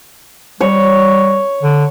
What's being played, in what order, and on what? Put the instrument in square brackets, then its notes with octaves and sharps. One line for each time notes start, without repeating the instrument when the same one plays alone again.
[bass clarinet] G3 [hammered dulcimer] C#5
[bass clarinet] D3